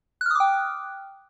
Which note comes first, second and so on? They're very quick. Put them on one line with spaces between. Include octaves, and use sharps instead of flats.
F#6 F6 D#6 D6 G5